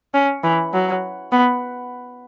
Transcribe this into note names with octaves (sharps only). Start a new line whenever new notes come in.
C#4
E3
F#3
B3